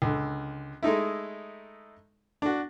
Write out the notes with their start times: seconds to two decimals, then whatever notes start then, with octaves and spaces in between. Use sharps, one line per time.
0.02 C#2 D3
0.83 G#3 A3 D#4 E4
2.42 D4 F#4